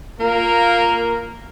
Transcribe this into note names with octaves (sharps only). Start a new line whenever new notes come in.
A#3 F4 A#4